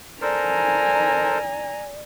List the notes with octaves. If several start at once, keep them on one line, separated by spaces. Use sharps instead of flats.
A4 A#4 C5 D5 G#5 A#5